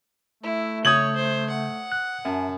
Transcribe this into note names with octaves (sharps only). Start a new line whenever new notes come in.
A3 E4
C#3 C#5 D#6 G6 G#6 F#7
C5
F#5
F#6
F#2 E5 G#5 A5